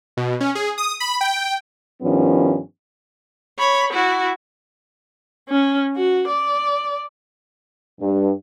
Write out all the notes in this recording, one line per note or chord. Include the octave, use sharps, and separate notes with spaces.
B2
C#4
G#4
D#6
B5
G5
G2 D#3 F3 B3 C#4 E4
C#5 B5
E4 F#4
C#4
F#4
D5
G2